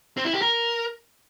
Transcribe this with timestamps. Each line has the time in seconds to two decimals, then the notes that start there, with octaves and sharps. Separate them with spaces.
0.17 C4
0.25 E4
0.33 G4
0.42 A#4